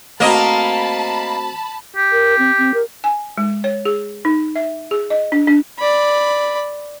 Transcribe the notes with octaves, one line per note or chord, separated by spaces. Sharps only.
A3 A#3 C4 F#4 D#5 A5 B5
G4
A#4
C4
C4
A#4
G#5
G#3
C#5
G#4
D#4
E5
G#4
D#5
D4
D4
D5 B5